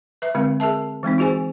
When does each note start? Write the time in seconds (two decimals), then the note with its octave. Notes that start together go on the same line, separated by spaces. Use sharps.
0.22 B4 E5
0.35 D3 G#3 C4 F5
0.60 G#4 A#4 E5 A5
1.03 E3 G#3 C4 D#4
1.18 F4 F#4 G#4 C5 G#5